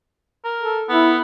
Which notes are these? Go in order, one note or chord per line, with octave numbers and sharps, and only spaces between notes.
A#4
A4
B3 E4